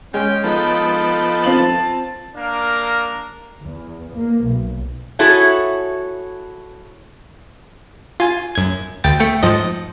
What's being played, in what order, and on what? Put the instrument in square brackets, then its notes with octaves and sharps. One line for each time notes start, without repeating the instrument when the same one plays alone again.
[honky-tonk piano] G#3 [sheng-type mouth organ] C#4 G6 [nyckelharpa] G5
[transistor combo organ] F3 B3 A4 [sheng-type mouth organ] D#4
[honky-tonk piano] C4 F4 F#7 [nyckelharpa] A5
[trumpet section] A#3 D4 A#4
[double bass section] E2
A#3
B1
[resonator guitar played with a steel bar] E4 F#4 G#4 A4 C#5 E5
[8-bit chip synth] F4 G#5
F#2 G#6
D2 G5 A6
A3 G5 C#7
G#2 F3 D#5